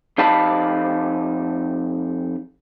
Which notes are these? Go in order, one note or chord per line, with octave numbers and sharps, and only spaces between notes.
F2 D#4 G4 F5 A5 B5